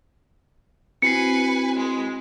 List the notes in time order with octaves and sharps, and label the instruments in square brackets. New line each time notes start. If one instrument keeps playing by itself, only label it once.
[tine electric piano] C4 E4 F#4 [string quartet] B4 G#5 [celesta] C7 C#7
[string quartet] G#3